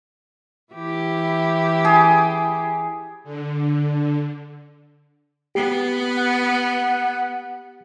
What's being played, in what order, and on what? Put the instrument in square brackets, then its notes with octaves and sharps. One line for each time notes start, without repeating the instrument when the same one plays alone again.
[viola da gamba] E3 E4 G4
[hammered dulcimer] G#4
[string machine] D3
[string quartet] B3 [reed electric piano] G4
[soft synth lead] F#5